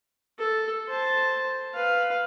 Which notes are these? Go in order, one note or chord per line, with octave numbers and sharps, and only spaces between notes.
A4
C5 A5
B4 F5